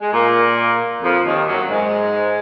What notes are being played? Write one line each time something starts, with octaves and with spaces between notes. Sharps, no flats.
G#3
A#2 A#3
F2 F3
D#2 D#3
F#2 F#3
G#2 G#3